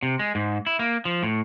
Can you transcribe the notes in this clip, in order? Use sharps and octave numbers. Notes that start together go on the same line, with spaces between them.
C3
G#3
G#2
E4
A#3
F3
A2